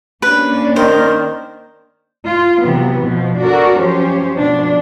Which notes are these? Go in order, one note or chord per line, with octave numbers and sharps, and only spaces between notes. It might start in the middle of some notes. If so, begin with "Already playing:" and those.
A#3 C#4 D4 B4
D#3 A#4 C5
F4
C3 E3 F#3 B3
B2 F3
D4 F#4 A4 A#4 D5
F3 F#3 C#4 G4 C5 C#5
B2 F3 D4